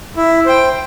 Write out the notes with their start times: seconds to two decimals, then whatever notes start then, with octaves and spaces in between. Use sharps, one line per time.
0.16 E4
0.45 C5 G5